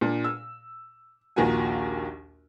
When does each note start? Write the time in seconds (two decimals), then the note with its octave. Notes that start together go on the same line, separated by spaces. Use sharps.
0.01 A#2 D4
0.24 E6
1.36 A#1 D#2 A#3 F4 F#4 G#5